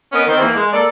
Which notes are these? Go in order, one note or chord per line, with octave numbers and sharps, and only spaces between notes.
B3 C#4 A#4 D#5
D#3 C4
E2 E3 A#3
G#3
A#3 A4 D5